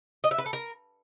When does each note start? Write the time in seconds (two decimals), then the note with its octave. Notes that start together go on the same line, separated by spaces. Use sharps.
0.24 D#5
0.31 E5
0.38 B4
0.46 A4
0.53 A#4